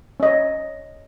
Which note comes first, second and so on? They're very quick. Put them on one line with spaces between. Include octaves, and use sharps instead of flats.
C#4 D#5 C#5